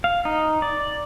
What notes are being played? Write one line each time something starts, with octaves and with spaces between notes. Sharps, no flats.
F5
D#4
D5